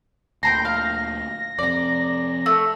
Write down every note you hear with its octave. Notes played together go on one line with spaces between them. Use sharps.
D2 A#2 G5 A#5 C6 A#6
F5
F2 C3 D5 A#5
A3 E6